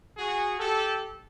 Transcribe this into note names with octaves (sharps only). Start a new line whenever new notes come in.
F#4 G#4
G4 A4